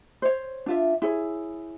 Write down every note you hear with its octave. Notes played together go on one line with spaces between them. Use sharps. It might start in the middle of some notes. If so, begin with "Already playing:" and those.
C5 C#5
D4 F4 E5
E4 G#4 C#5